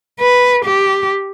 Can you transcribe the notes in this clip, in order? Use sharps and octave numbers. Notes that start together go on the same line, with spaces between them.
B4
G4